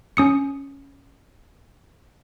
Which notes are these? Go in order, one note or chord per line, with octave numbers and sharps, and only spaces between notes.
C#4 D#6 C#7